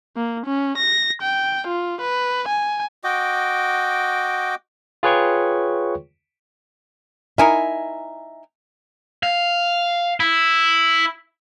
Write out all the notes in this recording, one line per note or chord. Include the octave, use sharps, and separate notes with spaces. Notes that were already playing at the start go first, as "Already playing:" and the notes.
A#3
C#4
A#6
G5
F4
B4
G#5
F#4 D#5 G5 D6
F4 G#4 B4 C#5 G5 C#6
D#4 E4 A#4 E5 G#5
F5
E4